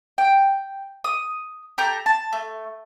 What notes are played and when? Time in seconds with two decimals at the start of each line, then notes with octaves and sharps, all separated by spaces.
0.18 G5
1.04 D#6
1.78 G4 A4 A#5 G6
2.06 A5
2.33 A3